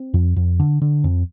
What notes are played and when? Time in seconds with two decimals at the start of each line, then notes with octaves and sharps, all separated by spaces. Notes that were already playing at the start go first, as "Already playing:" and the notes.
Already playing: C4
0.14 F2
0.36 F2
0.60 D3
0.82 D3
1.04 F2